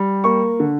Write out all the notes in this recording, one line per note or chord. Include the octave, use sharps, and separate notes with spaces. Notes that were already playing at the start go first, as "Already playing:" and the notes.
Already playing: G3
A#3 C#6
D3